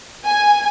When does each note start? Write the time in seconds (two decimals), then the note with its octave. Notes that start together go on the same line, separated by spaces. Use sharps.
0.25 G#5